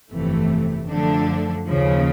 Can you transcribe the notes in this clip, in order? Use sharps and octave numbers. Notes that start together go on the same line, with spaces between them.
G1 F2 C3 E3 A3
F#2 D3 F3 A3 D4
D#2 C#3 F3